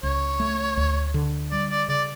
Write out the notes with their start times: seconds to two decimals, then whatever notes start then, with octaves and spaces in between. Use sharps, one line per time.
0.03 C#2 C#5
0.40 A3
0.77 D2
1.14 D3
1.51 G3 D5
1.70 D5
1.88 C#3 D5